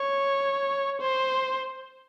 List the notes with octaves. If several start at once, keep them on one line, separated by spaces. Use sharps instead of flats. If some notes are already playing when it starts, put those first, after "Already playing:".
Already playing: C#5
C5